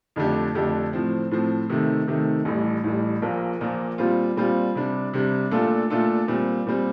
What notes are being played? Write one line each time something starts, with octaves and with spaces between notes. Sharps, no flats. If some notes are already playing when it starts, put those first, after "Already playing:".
F2 D3 A3 D4 G4
F2 D3 A3 D4 G4
A2 F3 C4
A2 F3 C4
C3 D#3 A3
C3 D#3 A3
A1 A2 G3
A1 A2 G3
A#1 A#2 F3 A#3
A#1 A#2 F3 A#3
A#2 G3 C4 F4
A#2 G3 C4 F4
C3 G3 D4
C3 G3 D4
A#2 A3 D4 F4 A4
A#2 A3 D4 F4 A4
A#2 G3 C4
A#2 G3 C4